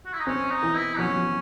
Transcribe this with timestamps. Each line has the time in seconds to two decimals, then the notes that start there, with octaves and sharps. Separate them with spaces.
0.06 F#4
0.13 E4
0.20 D#4
0.27 C4 C#4
0.50 D#4
0.63 E3
0.75 E4
0.98 F#3 C#4
1.16 F#3